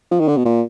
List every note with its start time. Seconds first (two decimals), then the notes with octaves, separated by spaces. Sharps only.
0.11 F3
0.20 D#3
0.28 D3
0.37 B2
0.45 A#2